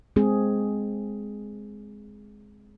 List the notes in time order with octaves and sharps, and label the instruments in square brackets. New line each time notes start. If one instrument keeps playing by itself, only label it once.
[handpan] G#3 C4 G#4